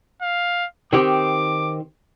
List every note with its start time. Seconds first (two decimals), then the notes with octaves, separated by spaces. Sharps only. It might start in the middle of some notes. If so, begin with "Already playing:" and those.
0.22 F5
0.93 D#3 C4 G4 D6